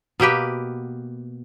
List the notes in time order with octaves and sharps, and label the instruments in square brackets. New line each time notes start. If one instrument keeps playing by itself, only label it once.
[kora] B2 A#3 G4 B4